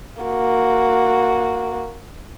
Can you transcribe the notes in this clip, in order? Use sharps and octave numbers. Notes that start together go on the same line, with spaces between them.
A#3 F#4